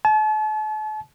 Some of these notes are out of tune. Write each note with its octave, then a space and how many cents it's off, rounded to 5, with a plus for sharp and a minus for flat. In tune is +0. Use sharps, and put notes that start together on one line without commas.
A5 -40